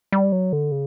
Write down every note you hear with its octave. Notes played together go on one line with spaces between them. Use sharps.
G3
F#3
D3
C#3